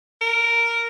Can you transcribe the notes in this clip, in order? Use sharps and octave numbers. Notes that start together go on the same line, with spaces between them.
A#4